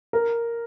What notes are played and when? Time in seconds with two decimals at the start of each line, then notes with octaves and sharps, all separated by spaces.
0.13 A#4